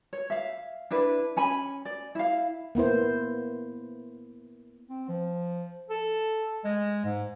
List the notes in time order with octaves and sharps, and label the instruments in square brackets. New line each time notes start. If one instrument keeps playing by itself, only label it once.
[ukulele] C#5
E5 F5
D4 E4 B4
C#4 G#5 B5
D5
E4 F5
[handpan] A#3 B3 E4 C5
[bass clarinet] C4
F3
A4
G#3
G#2